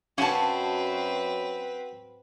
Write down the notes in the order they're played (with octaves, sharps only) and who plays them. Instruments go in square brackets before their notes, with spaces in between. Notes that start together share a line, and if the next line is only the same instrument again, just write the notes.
[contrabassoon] F#2 [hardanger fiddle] C4 B4 [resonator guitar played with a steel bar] C#4 A5 [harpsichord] F#4 F5